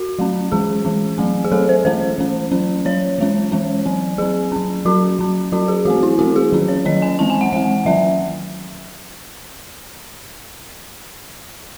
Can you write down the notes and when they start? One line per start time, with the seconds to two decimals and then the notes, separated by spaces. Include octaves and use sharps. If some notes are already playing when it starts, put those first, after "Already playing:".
Already playing: F#4
0.19 F#3 A3 C#4
0.52 E3 G#3 C#4 G#4
0.85 E3 G#3 C#4
1.18 F#3 A3 C4
1.45 G#4
1.52 F#3 A3 C4 A4
1.69 C5
1.85 E3 A3 C#4 C5
2.18 E3 A3 C#4
2.51 F#3 C#4
2.85 F#3 C#4 C#5
3.18 E3 G#3 C#4
3.52 E3 G#3 C#4
3.86 F#3 C4
4.18 F#3 C4 G#4
4.52 F#3 C#4
4.85 F#3 C#4 F#4
5.19 F#3 C#4
5.52 F#3 C#4 F#4
5.68 G#4
5.85 E3 A3 C4 F#4
6.03 E4
6.19 E3 A3 C4 F#4
6.36 G#4
6.53 D#3 F#3 C#4
6.69 C#5
6.85 D#3 F#3 C#4 D#5
7.02 G#5
7.19 E3 G#3 C4 A5
7.30 G#5
7.41 F#5
7.53 E3 G#3 C4 F#5
7.85 D#3 F#3 C#4 E5